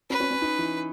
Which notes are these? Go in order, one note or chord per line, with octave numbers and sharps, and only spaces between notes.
C#4 B4
C#4
C#4
D#4
E3 E4